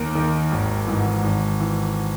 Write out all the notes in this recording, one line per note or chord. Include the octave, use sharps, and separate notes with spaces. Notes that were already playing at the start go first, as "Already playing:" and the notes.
Already playing: D#2 A#4
D#3
G#1
G#2 E3
G#1
E3